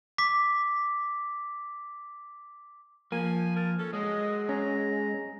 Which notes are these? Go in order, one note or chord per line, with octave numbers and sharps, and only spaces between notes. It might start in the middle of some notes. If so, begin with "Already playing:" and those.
D6 B6
F3 A#3 G#5
A#4 A5
C#4 A4
F#3 G#3 D#5
C#4 A#5